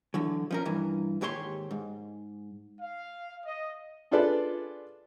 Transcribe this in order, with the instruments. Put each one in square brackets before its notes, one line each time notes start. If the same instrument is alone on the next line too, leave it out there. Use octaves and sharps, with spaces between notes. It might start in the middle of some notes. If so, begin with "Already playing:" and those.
[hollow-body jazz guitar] D3 E3 F#3
F3 C#4 A#4
G2 E3
D#2 G#2 G4 C#5 A#5 C6
G#2
[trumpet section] F5
D#5
[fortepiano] D4 F4 G#4 A4 B4 D5